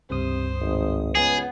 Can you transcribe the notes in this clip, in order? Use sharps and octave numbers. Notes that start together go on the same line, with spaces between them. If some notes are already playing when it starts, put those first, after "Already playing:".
C#2 G2 C3 C5 D#6
G#1
C#2 B3 G#4